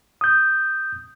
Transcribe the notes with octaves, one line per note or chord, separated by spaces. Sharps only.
D#6 G6